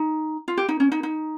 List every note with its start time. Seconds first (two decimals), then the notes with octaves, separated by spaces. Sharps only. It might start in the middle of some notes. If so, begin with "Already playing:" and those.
Already playing: D#4
0.48 F4
0.57 G4
0.69 D#4
0.80 C#4
0.92 D#4
1.03 D#4